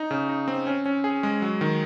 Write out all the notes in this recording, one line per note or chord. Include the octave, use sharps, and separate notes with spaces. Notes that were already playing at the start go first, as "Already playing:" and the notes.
Already playing: D#4
C#3
D#4
C4
C#4
C#4
G#4
G#3
F#3
D#3